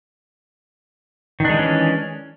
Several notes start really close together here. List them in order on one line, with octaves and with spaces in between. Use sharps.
D#3 D4 G#3 E3 C#4